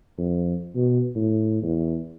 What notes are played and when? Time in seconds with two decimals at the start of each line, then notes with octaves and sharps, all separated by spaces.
0.18 F2
0.76 B2
1.15 A2
1.62 E2